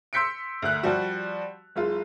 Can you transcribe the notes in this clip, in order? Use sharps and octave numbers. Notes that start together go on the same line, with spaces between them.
C6 E6 G6 B6 C#7 D7
D2 F#6
F3 G3 F#4
F#1 G#3 F4